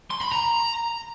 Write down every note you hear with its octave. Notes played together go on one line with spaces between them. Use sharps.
C6
B5
A#5